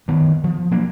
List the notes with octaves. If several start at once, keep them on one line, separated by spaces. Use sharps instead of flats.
G2 D#3 B3
F3
F#3 A#3 D4